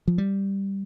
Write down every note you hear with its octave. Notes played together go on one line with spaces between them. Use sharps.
F3
G3